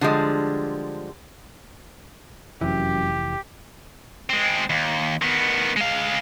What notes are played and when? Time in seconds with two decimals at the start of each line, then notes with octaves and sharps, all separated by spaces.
0.01 D3 F3 G3 G#3
2.61 F1 F#2 E3 G4
4.30 G#3 C4
4.70 D#2
5.22 D#3 B3
5.76 G#3 F5